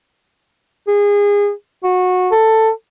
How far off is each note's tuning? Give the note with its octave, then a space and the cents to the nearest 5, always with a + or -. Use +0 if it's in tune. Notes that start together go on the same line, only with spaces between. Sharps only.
G#4 -25
F#4 -20
A4 +10